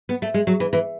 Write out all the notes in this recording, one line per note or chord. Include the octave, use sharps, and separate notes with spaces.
B3
A3
G#3
F#3
E3
E3